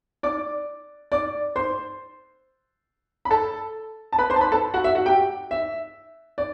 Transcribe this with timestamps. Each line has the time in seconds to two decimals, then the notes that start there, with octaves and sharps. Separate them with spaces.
0.23 D5 D6
1.12 D5 D6
1.56 C5 C6
3.25 B5
3.31 A4 A5
4.13 A5
4.18 B4 B5
4.30 C5 C6
4.36 A5
4.41 B4 B5
4.52 A4 A5
4.74 F#4 F#5
4.84 E5
4.95 F#4 F#5
5.06 G4 G5
5.51 E5
6.38 D5